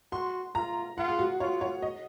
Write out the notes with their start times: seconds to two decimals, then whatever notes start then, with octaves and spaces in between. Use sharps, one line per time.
0.12 F#4 C6
0.55 F4 A#5
0.98 F4 F#5
1.08 G#4
1.19 F#4
1.40 F4 C#5
1.61 C#5
1.82 D#5